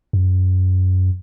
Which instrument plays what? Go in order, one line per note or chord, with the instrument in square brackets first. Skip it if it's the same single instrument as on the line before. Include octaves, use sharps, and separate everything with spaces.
[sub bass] F#2